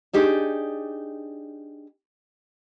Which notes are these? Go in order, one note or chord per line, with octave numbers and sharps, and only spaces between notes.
D4 D#4 G4 G#4